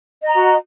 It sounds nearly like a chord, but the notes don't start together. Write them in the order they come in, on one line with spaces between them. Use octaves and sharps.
D#5 A#5 F#4